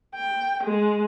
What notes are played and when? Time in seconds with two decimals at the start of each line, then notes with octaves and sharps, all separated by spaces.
0.15 G5
0.64 G#3